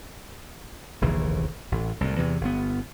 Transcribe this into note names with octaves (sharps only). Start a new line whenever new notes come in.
F1 A#1 D#2 E3
A1
C2 A2
E2 C3 E3
G1 B3